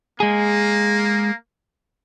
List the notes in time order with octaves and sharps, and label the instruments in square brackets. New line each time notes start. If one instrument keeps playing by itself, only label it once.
[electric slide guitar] G#3 G#4 [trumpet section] A#3